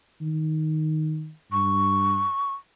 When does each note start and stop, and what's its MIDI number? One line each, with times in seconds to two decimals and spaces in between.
0.21 1.31 51
1.52 2.26 43
1.52 2.52 85